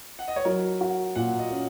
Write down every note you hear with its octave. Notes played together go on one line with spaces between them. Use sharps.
F#5
D#5
C#5
F#3 A#4
F#4
A#2 F#5
D#5
C#4